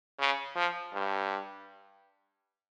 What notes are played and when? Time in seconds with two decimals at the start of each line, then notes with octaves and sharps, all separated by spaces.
0.19 C#3
0.56 F3
0.94 G2